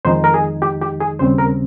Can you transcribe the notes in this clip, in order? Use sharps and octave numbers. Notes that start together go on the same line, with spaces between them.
F2 D#3 G#3 D#4 C5
A#4
G#4
G4
G4
G#4
D#2 C#3 G3 C4 C5
A#4